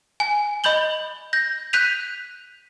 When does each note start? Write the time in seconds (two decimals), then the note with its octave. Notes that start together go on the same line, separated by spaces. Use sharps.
0.20 G#5
0.64 D#5 B5 G6 F#7 G7
1.33 G6 A#6
1.73 F#6 G6 B6 D#7 F7